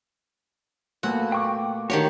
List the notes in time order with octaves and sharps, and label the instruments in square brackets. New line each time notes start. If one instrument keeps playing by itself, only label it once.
[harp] A#2 A3 B3 [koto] F#4
[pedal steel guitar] G5 C#6 D6
[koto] D#3 G4 C#5 [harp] D4 [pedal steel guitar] F#4 C5